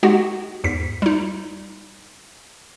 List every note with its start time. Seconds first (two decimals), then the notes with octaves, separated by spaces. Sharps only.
0.03 G#3 D#4 F#4 G4 F#5
0.64 E2 G#2 B6
1.02 G3 D#4